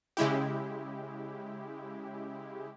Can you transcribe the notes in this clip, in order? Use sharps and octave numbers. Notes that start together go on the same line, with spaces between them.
C#3 G#3 E4 G4